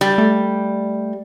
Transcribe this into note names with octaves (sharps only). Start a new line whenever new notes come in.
G3
A3